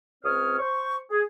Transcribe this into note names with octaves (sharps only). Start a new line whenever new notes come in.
C#2 C4 C5 C#5 D#6 F6
C5 C#6
G#4